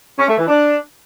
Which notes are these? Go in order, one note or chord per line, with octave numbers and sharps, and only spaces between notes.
C#4
A3
E3
D4